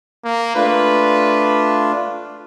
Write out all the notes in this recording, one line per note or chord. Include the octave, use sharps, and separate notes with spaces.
A#3
A3 D4 F4 B4